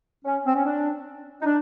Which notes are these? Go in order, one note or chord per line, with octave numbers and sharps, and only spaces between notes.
C#4
C4
C#4
D4
D#4
D4